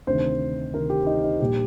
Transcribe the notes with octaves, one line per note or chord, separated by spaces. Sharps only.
D2 C3 D#3 C5
D2 C3 D#3 A#4
G4
D#4
D#4
A#1 A#2 G3 G4